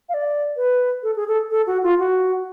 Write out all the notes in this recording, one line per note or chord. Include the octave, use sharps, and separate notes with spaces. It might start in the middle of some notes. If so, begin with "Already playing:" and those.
F5
D5
B4
A4
G#4
A4
A4
F#4
F4
F#4